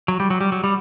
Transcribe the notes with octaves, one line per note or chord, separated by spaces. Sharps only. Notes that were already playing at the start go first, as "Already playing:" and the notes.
F#3
G3
F#3
G3
F#3
G3